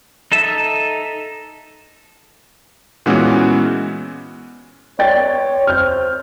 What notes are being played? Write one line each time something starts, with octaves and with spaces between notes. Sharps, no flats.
D#4 A4 E5
A#2 E3 G#3 B3 C#4 F#4
C#5 D5 G5 A6
C4 F6 G6